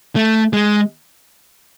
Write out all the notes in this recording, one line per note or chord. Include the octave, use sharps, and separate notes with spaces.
A3
G#3